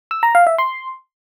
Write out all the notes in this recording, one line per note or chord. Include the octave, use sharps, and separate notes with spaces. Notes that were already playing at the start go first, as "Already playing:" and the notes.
E6
A#5
F5
E5
C6